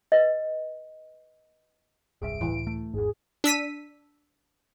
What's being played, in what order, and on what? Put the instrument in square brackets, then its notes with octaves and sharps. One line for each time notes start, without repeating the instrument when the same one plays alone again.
[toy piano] B4 D#5
[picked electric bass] E1 C2 G2 [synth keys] G#4 E5 [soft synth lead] D7
[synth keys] C#2 A2 [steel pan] E3
[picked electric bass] A3
[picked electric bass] G#1 E2 [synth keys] G#2 [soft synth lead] G#4
[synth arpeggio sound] D4 E6 B6 D#7